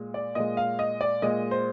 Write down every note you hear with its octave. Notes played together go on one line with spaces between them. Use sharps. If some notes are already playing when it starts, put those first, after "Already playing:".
Already playing: A#2 G#3
D5
A#2 G#3 D#5
F5
D#5
D5
A#2 G#3 D#5
C5